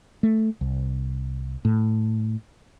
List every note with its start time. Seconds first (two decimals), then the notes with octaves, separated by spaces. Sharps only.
0.23 A3
0.61 C2
1.65 A2